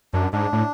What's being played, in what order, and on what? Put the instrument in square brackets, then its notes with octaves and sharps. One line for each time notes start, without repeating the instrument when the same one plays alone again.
[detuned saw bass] F#2 [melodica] D4
[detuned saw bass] G#2 [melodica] D4
[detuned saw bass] A2